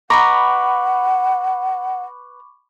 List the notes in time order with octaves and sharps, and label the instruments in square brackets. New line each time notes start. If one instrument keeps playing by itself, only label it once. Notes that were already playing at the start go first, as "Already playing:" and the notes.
[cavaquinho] B4 D#5 A#5 [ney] F#5 [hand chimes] B5 C#6 D6